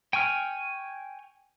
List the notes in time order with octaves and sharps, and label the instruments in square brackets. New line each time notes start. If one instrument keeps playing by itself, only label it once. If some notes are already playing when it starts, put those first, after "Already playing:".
[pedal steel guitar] G5 G#5 C#6 F6